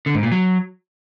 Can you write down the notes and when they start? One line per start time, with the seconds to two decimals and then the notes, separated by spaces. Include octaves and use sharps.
0.06 D3
0.15 G#2
0.23 A#2
0.32 F#3